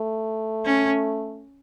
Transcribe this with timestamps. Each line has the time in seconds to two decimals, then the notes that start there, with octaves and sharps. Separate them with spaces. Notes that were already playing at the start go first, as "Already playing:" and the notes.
Already playing: A3
0.65 C#4